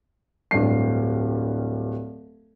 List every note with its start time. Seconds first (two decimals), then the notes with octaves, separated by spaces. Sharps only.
0.51 D1 G2 C7